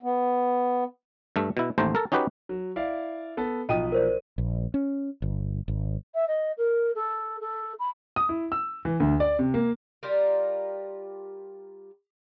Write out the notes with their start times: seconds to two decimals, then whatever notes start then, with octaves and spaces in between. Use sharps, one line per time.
0.03 B3
1.36 G2 A3 E5
1.57 B2 E4
1.78 A1 D#2 A3 C5 A#5
1.95 A4 A#4
2.12 C#4 D#4 F#4 G4 B4
2.49 F#3
2.76 E4 D5 F5
3.37 B3 A4
3.69 B1 F3 D#5 G5 D#6 D#7
3.92 A#4 C5 D5
4.38 A#1
4.74 C#4
5.22 G1
5.68 G#1
6.15 E5
6.28 D#5
6.58 A#4
6.95 A4
7.41 A4
7.79 B5
8.16 D#6
8.29 E4
8.52 E6
8.85 E3
9.00 D2
9.20 D5
9.39 C3
9.54 A#3
10.03 G3 F4 G4 A#4